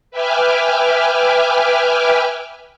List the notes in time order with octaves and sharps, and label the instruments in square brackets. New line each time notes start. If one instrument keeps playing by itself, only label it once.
[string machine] B4 E5 G5 G#5 D6 F6